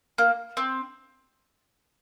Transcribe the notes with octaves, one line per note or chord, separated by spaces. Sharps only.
A#3
C4